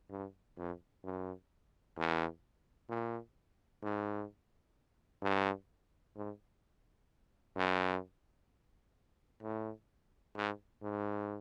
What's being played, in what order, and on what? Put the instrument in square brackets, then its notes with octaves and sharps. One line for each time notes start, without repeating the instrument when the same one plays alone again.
[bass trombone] G2
F2
F#2
E2
A#2
G#2
G2
G#2
F#2
A2
G#2
G#2